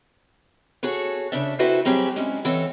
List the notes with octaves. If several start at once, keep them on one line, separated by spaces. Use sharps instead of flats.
F#4 G#4 A4 C#5
C#3 D4 E5
C4 E4 F#4 A4 B4 C5
F#3 G3 C4 G4 G#4
G#3 C#4 D4 E4
E3 C4 A4 C#5 F#5